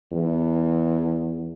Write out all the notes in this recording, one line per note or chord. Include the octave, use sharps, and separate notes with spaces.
E2